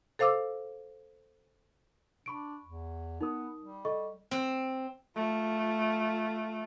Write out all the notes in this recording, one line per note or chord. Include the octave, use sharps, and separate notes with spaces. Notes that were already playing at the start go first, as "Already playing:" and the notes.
A4 C5 F5 D6 E6
D4 B5 C#6 D7
E2
B3 D#4 A#4 D#6
G3
A4 D#5 C#6
C4
A3 F4